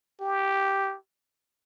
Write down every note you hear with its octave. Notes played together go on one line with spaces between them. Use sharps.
G4